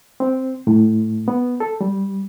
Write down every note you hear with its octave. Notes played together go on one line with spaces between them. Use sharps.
C4
A2
B3
A4
G3